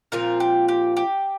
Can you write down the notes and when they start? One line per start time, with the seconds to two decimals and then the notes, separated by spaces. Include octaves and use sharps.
0.12 A#2 F3 C4 F4 A#4
0.40 G4
0.68 G4
0.97 G4